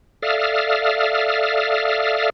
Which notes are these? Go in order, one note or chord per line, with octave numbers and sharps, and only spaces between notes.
A4 D5 E5 F5 D#6 F6